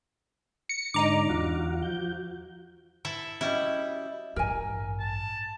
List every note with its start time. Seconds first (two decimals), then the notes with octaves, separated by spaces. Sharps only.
0.69 A#6 C#7
0.94 G#2 D3 D4 D#4 A#5 D6
1.29 E2 F4 F#4
1.82 F3 F#4 G6
3.05 E4 A4 E5
3.41 G3 C#4 E4 F#4 D#5
4.36 A1 G2 A#4 G#5
4.99 A5